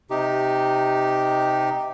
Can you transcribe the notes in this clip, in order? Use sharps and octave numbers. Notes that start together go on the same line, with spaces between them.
C3 D#4 G4